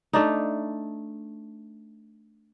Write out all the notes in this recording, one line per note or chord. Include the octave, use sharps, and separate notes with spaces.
A3 D4 D#4